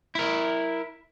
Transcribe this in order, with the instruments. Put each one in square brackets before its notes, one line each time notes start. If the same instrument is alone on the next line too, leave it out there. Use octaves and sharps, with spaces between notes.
[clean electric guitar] E4 A#4